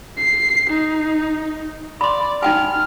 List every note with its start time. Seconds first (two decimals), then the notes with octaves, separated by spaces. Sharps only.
0.17 C7
0.69 D#4
2.01 D5 B5 C6
2.43 D#4 G5 G#5 F6